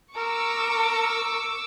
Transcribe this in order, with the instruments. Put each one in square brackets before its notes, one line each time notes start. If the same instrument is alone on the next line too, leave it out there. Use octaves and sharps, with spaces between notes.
[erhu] A#4 [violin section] C#6 D6 E6